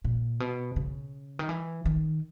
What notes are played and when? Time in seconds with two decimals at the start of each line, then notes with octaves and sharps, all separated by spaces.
0.04 A#2
0.40 B2
0.76 C#3
1.39 D#3
1.49 E3
1.85 D#3